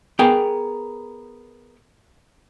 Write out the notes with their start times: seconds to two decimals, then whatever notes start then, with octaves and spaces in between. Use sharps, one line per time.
0.19 B3 G#4 A#4 G5